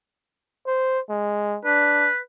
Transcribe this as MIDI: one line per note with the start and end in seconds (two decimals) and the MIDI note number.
0.67 0.99 72
1.09 1.58 56
1.65 2.08 62
1.65 2.17 71